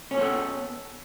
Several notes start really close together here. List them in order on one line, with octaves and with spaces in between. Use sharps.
C#4 C#5 B3 A4